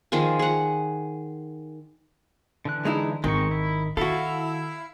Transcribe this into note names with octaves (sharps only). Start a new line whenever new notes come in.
D#3 F3 F4 G#4
G#4 F#5
D3 E3 F#6
G#3 D#4 E4
G#1 D#3 G#3 C4 C#6
E4
D#3 E4 F#4 A4 F5